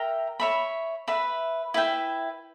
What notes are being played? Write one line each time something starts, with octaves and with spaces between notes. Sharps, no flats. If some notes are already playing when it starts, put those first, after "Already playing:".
Already playing: A#4 E5 G5 A#5
C#5 E5 B5
B4 E5 B5
E4 B4 E5 G5